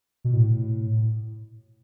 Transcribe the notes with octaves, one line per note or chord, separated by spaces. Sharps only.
B2
A2